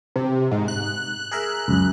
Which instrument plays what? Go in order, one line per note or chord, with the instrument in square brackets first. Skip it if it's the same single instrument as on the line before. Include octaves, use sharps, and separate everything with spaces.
[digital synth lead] C3
G#2
F#6
[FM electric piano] G#4 A#4 E5
C#2 F#2